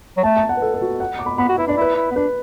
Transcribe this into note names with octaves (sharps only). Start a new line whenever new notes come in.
F#3
A3 A5
A5
F#5
B4
A4
A4
F#4
F#5
D6
B5
B3 B5
F#4
E4 B4
D4 D5
E4 B4
E4
B3
D4 B4